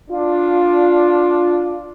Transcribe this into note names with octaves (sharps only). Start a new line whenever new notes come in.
D4 F4